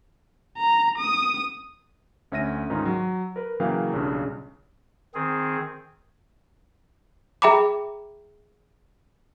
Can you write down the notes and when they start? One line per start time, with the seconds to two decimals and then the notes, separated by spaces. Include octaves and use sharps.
0.57 A#5
0.98 D#6
2.32 D2 C#4 E5 A#6 D#7
2.70 G#2 D#3 C#4 D#4 F4
2.85 F#3
3.36 A#4 B4
3.60 C#3 E3 F#3 A#3 F5 G5
3.93 B1 G2 C#3 F4
5.14 D#3 C4 G#4
7.42 G#4 E5 G5 A#5 B5 D6